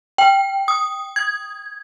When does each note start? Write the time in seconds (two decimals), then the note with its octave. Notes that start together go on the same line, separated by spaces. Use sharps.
0.18 G5
0.68 D#6
1.16 G#6